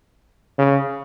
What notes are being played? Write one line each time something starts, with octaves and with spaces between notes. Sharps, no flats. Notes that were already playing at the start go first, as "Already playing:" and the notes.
C#3